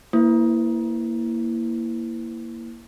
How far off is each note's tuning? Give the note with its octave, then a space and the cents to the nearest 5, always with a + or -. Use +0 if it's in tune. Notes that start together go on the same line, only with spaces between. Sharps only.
A#3 +0 E4 +0 B4 +45